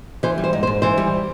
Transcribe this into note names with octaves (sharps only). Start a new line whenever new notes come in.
E3 C5
G3
C5
G#2
C5
G#2
E3 C5
G3